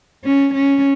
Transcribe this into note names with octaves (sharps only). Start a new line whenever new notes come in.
C#4
C#4